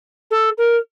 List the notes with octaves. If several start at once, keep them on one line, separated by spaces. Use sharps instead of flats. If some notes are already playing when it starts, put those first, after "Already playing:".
A4
A#4